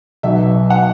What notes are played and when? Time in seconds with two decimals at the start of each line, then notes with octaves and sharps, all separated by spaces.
0.23 B1 B2 F#3 E5
0.70 F#5